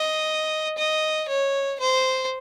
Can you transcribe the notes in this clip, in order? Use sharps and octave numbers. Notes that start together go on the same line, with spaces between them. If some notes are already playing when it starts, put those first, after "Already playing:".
Already playing: D#5
D#5
C#5
C5